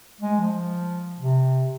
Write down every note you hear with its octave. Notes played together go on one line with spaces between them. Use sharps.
G#3
F3
C3